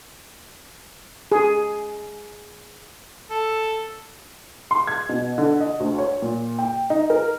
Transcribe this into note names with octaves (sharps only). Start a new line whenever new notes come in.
G#4
A4
C6
G#6
B2
D3
D#5
D2
C#5
A#2
G5
D#4
A#4